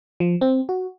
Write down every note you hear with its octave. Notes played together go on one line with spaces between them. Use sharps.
F3
C4
F#4